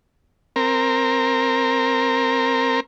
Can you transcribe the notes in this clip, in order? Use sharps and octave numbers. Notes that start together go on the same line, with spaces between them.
C4 A#4